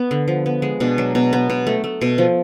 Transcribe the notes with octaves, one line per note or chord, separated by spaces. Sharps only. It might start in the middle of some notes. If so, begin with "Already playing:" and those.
Already playing: B3
D3
F3
B3
G#3
B2 D4
F#3
B2
B3
B2
A3
A3
B2
F3